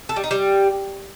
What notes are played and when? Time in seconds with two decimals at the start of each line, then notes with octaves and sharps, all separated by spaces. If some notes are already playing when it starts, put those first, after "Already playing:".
0.09 A4
0.16 G3
0.24 D#4
0.31 G3